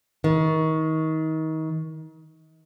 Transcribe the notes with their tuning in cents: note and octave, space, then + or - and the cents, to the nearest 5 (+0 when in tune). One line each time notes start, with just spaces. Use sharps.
D#3 +30